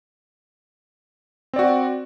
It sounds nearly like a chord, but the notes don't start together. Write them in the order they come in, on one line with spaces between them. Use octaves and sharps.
C4 D5 F#4